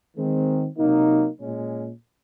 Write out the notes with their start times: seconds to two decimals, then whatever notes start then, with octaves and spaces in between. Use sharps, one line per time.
0.16 D#3 G#3 C4
0.78 C3 F#3 A#3 D#4
1.40 A#2 G#3 C#4